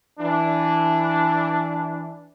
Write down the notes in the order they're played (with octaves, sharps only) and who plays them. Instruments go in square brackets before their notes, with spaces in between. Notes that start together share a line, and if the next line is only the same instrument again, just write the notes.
[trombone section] E3 D4